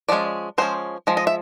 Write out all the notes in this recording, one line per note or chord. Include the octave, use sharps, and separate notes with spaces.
F3 G#3 C#4 D5
F3 G#3 C#4 C5
F3 G#3
D#5
E5